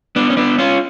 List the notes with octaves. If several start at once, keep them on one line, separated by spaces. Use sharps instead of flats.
B3 D4
C#4
B3 D4
C#4 F4